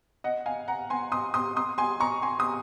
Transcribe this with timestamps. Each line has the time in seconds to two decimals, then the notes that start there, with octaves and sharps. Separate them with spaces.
0.24 D#5 F#5
0.46 F5 G#5
0.68 F#5 A#5
0.90 G#5 C6
1.12 C6 D#6
1.34 C6 D#6
1.56 C6 D#6
1.78 G#5 C6
2.00 A#5 C#6
2.22 G#5 C6
2.39 C6 D#6